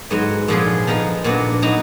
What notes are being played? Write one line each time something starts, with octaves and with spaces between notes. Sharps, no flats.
G#2 F#3 B3
A#2 F3 B3 F4 G#4
F3 B3 D#4 A#4
A#2 F#3 B3 D4
F#3 B3 D#4